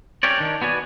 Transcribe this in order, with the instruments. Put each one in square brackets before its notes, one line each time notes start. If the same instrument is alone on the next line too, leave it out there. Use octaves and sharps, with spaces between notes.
[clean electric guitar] C#4 G4 A#4 C#5 D5
D#3 D4
B3 F#4 D5 G#5